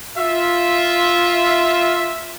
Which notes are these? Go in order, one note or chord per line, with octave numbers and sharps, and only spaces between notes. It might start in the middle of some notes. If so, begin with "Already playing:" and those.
F4 E5